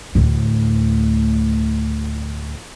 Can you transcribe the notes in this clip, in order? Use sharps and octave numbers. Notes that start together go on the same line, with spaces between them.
D2 A2